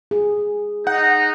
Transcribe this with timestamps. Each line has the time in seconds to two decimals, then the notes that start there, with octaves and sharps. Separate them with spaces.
0.11 G#4
0.87 D#4 F#5